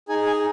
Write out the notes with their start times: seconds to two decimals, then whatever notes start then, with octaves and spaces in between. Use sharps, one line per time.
0.08 D#4 G#4 G#5
0.26 G#5